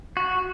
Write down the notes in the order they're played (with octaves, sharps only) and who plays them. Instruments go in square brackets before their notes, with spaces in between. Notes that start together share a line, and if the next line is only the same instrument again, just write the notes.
[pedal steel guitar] F#4